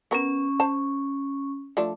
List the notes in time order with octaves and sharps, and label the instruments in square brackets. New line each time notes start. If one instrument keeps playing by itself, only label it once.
[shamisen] B3 A#4 [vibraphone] C#4 C#6
[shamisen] C5 A5
F3 A3 D4